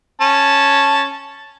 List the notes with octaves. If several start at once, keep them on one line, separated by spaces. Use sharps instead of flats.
C#4 A5